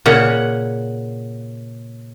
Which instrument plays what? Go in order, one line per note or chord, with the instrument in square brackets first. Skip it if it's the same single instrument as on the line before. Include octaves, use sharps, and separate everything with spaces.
[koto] A#2 C#3 F#5